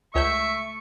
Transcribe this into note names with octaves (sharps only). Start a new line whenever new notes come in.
C#2 A3 C#5 E5 C#6 G6